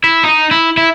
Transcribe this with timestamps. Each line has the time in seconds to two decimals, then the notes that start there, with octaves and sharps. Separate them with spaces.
0.04 E4
0.24 D#4
0.51 E4
0.77 E4